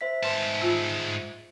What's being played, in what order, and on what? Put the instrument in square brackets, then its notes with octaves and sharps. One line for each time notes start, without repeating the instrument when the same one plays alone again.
[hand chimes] C5 E5 B6
[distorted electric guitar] G#2 A5 [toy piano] B4 C6 D6
[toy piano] F4 E6